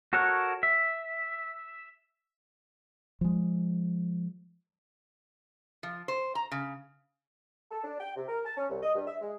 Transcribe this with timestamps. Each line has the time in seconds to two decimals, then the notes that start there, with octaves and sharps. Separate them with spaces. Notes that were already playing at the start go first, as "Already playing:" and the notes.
0.13 F#4 A4 A#4 C#5 F#5
0.63 E5
3.21 F3 G#3
5.83 F3
6.08 C5
6.35 A#5
6.51 C#3
7.72 A4
7.84 D4
8.00 G5
8.16 C3
8.29 A#4
8.45 A5
8.57 C#4
8.70 C2
8.83 D#5
8.95 G2
9.08 E5
9.22 G#3